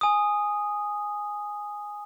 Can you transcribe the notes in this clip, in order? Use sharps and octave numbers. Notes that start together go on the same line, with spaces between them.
G#5 D#6